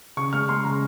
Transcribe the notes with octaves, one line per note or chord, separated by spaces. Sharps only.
C#3 C#6
G#3 F6
G#3 C6
C#3 A#5